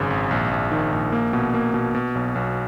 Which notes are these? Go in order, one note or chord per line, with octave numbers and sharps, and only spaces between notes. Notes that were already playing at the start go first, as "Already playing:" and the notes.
Already playing: G#1 F#2 C#3
G#1
A#1
A#1
D#3
A#1
A#3
B2
A#3
B2
B2
B1
B1